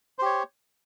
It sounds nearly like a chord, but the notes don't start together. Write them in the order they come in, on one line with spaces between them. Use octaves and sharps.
C5 G4 C#5